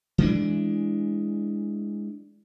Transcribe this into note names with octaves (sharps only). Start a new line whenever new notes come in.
E3 G#3 D4